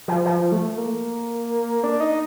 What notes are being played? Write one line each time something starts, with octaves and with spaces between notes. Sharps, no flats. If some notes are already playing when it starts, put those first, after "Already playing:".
F3
F3
A3
A#3
D4
D#4